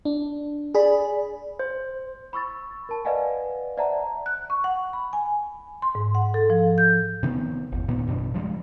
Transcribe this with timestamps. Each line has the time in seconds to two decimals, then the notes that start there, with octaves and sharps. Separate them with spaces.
0.05 D4
0.75 G#4 D5 B5
1.59 C5
2.33 B5 C#6 E6 A6
2.89 A#4 A5
3.05 B4 D5 D#5 F5 F#5 G#5
3.77 C5 D5 E5 F#5 A5 A#5
4.26 F#6
4.50 C#6
4.64 F#5
4.93 B5
5.13 G#5
5.82 C6
5.95 G#2
6.15 F#5
6.34 A4
6.50 F3
6.78 G6
7.23 C3 D#3 B3
7.72 G1 E2
7.88 A#2 D#3 B3
8.07 A1 F#2 B2 D4
8.34 C#3 F3 G3 G#3